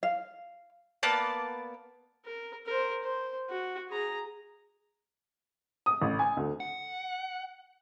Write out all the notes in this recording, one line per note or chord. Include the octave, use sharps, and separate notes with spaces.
F5
A#3 B3 D5 A5
A#4
A#4 C5
C5
F#4
G#4 A#5
D#6
A1
G#5
D2
F#5